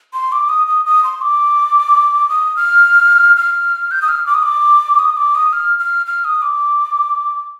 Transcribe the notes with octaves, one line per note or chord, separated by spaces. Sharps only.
C6
D6
D#6
D#6
D#6
C6
D6
D#6
F6
F6
G6
D#6
F6
D6
D#6
D6
D#6
D6
D#6
F6
F6
F6
D#6
D6